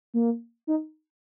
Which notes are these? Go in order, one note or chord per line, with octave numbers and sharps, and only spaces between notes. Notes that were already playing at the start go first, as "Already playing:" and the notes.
A#3
D#4